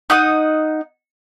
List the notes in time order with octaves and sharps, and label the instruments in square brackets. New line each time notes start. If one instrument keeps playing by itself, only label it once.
[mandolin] D#4 F#5 D#6